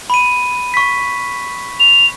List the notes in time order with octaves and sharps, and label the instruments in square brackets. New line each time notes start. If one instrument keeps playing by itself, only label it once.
[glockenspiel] B5 D#7
C#6 B6
[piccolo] F7